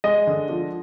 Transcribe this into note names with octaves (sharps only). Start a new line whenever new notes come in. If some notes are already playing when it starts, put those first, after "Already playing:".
G#3 D#5
D3
F3